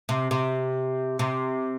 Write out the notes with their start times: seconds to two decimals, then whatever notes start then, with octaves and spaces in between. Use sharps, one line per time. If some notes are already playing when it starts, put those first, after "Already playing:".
0.09 C3
0.31 C3
1.19 C3